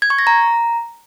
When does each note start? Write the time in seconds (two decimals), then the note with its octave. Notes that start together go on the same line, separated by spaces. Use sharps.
0.02 G#6
0.10 C#6
0.19 A#6
0.27 A#5